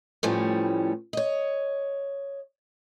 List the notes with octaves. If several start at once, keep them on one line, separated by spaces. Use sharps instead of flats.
A2 E3 F3 G3 A3 C#4
C#5 D#5